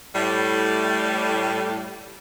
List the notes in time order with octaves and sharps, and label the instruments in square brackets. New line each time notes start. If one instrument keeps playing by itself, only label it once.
[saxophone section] A2 G3